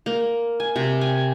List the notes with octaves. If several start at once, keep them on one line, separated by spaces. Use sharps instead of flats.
A#3
G#5
C3
G#5